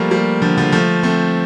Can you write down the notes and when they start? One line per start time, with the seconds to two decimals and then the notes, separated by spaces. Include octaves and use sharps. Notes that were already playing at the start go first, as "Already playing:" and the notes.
Already playing: F3 G3 A3 A#3
0.11 G3 A#3
0.42 D3 F3
0.58 D3 F3
0.72 F3 A3
1.03 A3 C4